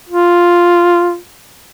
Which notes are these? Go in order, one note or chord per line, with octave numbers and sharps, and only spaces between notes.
F4